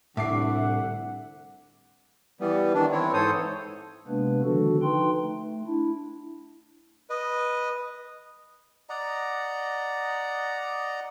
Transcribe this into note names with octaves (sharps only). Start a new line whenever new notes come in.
C2 A2 D3 E5 F#5 D6 C7
E3 G3 B3
D#3 E3 D4
E3 C4 E4 C#5
G#2 E3 A4 C5 C#5 D#6
C3 G#3 A#3 B3 D4 B4
D3 D#3 F3 D4 F#4 A4
D#4 B4 G5 C6
A3
D4 E4
B4 D#5
D5 D#5 F#5 A#5